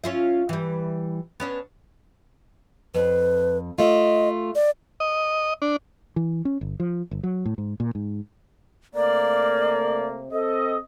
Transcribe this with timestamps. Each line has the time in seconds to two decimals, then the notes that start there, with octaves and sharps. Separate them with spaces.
0.04 C#4 F4 E5
0.49 E3 G3
1.40 B3 C#4 D4
2.95 F2 B4
3.78 A3 F4 D#5
4.55 D5
5.00 D#5
5.62 D4
6.16 E3
6.45 C#4
6.61 G1
6.80 F3
7.11 G1
7.23 F#3
7.45 A2
7.58 G#2
7.80 A#2
7.95 G#2
8.94 C3 A3 A#3 D5
10.31 C4 A4 D#5